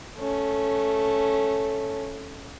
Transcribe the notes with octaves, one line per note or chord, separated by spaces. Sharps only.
A3 C#4